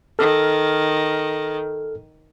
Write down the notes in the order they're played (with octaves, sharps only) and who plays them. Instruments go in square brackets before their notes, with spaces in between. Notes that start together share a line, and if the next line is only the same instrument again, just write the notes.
[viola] D#3 [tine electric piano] A4 F6